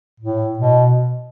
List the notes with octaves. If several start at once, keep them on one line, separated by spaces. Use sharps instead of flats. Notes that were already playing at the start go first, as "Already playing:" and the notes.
A2
B2